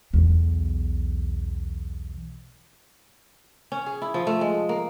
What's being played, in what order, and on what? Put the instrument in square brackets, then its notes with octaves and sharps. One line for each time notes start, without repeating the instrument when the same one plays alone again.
[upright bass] B1 E2
[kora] C#4
G#4
E4
F3
A3
G#3
A#3